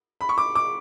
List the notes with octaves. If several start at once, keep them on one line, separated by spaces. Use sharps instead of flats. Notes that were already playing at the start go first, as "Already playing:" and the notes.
B5
C#6
D6
D6